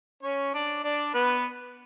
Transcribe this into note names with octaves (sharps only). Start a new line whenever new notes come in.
C#4 C#5
D4 D5
D4 D5
B3 B4